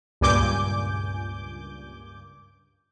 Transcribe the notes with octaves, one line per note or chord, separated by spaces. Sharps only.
C#2 G2 A#2 G#5 D6 G6